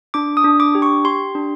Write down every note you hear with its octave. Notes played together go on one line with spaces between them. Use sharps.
D4 D6
D#6
D4
D6
G4
C#6
G4 C6
D4